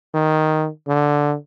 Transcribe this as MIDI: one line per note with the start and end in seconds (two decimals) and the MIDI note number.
0.14 0.68 51
0.88 1.36 50